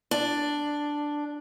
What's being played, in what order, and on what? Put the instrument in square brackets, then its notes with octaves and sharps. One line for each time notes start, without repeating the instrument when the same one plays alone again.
[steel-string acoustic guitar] D4